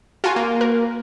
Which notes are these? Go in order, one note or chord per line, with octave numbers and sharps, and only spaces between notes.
F4 F#4 G#5
A#3
A#4